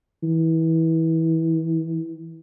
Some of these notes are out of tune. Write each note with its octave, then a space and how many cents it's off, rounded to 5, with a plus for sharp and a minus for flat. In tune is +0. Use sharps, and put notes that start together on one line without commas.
E3 -25